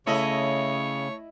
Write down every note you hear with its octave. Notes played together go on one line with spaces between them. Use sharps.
C#3 A3 E4 C#5 D#5